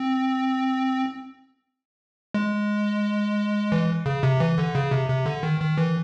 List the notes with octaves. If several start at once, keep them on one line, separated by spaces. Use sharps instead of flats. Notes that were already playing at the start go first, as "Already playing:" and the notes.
Already playing: C4
G#3
E3
C#3
C3
E3
D3
C#3
C3
C3
D3
D#3
D#3
E3